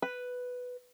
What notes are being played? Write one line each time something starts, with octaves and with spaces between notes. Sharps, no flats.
B4